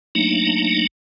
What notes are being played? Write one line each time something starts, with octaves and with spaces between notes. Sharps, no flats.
F#3 A3 A#3 D4 D#4